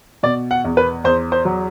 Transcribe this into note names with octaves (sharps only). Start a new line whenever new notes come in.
B2 D5
F#5
E2
B4
E2 C5
C5
F#3